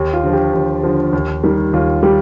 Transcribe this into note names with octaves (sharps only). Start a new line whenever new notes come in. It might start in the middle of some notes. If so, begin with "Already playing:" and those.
Already playing: D#2 G4
F4
D3 F3
G4
D#2
D3 F3
D#2
D#3 G3
D#2 F4
G3 G4